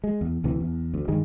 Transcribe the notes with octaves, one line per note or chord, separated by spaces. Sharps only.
G#3
E2
D2 C3 E3
E2
D2
G2 D#3 G3 G#3